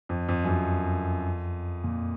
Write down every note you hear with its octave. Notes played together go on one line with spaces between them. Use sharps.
F2
F2
F#2
F2
A#2